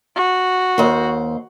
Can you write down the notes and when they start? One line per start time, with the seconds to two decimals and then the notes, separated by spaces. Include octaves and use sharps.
0.16 F#4
0.78 D#2 C5